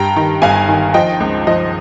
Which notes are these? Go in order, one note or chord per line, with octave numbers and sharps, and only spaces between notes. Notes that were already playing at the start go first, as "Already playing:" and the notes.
Already playing: G2 G5 A#5
D#3
G1 F5 G#5
D#3
F3 D#5 G5
C#2
F3 D#5